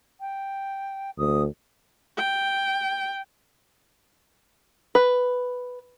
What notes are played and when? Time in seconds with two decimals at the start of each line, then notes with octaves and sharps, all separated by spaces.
0.20 G5
1.18 D2 D#6
2.17 G5
4.95 B4